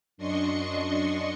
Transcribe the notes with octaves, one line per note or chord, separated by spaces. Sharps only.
F#2 D4 D#5 C6 C#6 C#7